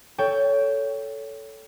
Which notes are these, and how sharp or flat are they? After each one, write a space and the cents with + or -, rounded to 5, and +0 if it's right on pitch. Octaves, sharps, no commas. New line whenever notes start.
A4 +0 C#5 +20 G5 +0